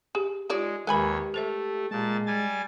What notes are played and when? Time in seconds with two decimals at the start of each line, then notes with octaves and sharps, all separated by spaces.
0.15 G4 G#4
0.50 G#3 D#4 F4 G4 C#5 D5
0.87 D#2 G#3 G4 A#4 B4 C#5 G#5 B5
1.34 A3 A4 C5 E5
1.91 A#2 G#3 A5
2.27 G3 G#5 A6